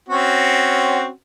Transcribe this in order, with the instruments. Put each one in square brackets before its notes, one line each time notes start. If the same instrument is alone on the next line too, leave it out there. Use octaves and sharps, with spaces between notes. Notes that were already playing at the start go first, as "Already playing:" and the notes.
[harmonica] C4 C#4 F#4